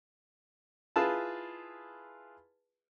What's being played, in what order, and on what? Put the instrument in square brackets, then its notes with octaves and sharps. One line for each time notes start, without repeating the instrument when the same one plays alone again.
[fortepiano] E4 F4 G#4 B4 A5